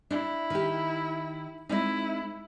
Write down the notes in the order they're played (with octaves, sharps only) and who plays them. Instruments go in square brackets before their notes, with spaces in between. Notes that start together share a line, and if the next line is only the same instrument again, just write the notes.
[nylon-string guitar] D4 [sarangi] E4
[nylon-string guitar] D#3 G4
[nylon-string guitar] G#3 C4 D#4 [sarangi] E4